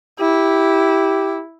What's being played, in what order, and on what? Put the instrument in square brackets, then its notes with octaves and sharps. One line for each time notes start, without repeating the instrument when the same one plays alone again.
[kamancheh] E4 [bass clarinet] G4